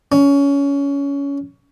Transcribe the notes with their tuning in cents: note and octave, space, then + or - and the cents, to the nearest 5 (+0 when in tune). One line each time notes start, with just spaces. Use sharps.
C#4 +20